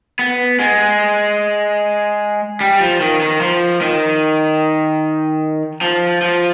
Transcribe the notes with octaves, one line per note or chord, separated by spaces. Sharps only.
B3
G#3
G3
F3
D#3
D#3
F3
D#3
F3
F3